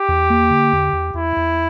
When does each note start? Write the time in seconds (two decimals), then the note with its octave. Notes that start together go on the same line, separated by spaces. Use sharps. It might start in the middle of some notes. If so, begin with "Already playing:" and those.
Already playing: G4
0.08 E2
0.30 A#3
0.50 D3
0.72 E2
0.93 E2
1.14 E2 E4
1.36 E2